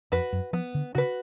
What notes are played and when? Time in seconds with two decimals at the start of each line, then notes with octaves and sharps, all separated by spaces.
0.12 F2 F#4 B4
0.33 F#2
0.53 F3 B3
0.75 D3
0.95 C#3 F#4
0.98 B4